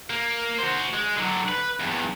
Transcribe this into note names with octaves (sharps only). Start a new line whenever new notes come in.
A#3
F#4 C5
G#3
D3 F#3
B4
E2 G2